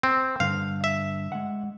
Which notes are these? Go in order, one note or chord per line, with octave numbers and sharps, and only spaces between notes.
C4
G2 D3 F5
E5
G#3 F#5